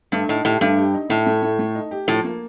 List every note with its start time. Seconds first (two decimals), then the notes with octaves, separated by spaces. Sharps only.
0.12 G2 A3
0.28 A2 D#4
0.45 A2 G4
0.61 G2 A3
0.78 G4
0.94 D#4
1.09 A2 A3
1.26 A3
1.42 A3
1.59 A3
1.75 D#4
1.91 G4
2.08 A2 F3
2.24 A#3